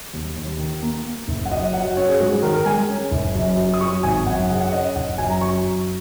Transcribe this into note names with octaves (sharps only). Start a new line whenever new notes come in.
D#2
D#2
D#3
A#3
A#3
F#1
F#5
F#2 D#5
F#3 F#5
C#4 C#5
G#4
G#2 F#4
G#4
D#3 A#4
A#4
G#3 G#5
C#4
F#1
F#2
F#3
D#6
F#3 C#6
G#1 G#5
F#2 F#5
C#3 F#5
F#5
C#4 D#5
F#1 F#5
F#2 G#5
A#5
F#3 C#6
F#2